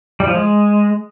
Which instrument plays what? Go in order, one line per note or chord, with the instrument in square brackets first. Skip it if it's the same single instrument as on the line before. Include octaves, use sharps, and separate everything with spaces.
[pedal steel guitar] G3
F3
G#3